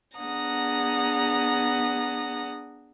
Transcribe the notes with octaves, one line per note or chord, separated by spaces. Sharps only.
B3 D4 G#4 F#5 A#5 D#6